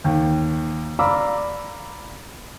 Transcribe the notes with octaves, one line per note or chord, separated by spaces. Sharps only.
D#2 G5
D5 F5 A#5 B5 D6 E6